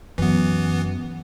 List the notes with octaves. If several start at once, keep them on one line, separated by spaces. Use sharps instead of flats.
F#2 E3 B3